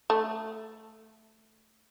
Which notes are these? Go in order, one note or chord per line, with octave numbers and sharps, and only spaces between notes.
A3